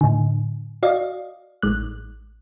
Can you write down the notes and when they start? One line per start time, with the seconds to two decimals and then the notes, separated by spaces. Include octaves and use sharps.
0.01 A2 D3
0.83 F#4 D5 D#5 F5
1.63 A1 G#3 F#6